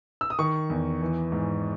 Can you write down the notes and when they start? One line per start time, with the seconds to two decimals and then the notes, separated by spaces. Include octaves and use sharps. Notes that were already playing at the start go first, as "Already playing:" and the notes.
0.21 E6
0.30 D#6
0.39 D#3 C#6
0.70 E2
1.01 E3
1.32 G#2